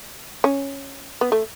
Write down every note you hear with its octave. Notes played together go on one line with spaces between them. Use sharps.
C#4
B3
A3